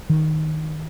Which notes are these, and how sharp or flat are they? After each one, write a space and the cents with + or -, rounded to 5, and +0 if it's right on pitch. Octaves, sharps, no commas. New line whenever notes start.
D#3 +5